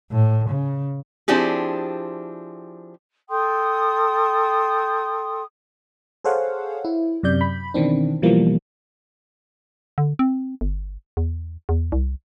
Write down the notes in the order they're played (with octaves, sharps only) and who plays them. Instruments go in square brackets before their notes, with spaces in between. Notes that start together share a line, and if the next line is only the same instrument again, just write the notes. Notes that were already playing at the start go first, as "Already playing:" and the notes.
[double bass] A2
C#3
[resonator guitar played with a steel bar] F3 C4 D4 E4 G4 G#4
[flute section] A4 G5 C6 D#6
[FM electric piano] G#4 A4 C5 C#5 F5 F#5
E4
F#2 C3 D5 G6
B5
B2 D#3 E3 C4 D4
B2 E3 F3 G3 A#3
[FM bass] D3
C4
G1
E2
E2
C2